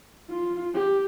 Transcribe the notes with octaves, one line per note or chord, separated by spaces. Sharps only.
F4
G4